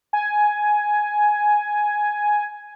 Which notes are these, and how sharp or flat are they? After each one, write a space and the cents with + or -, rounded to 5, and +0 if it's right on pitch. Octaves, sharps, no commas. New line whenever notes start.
G#5 +5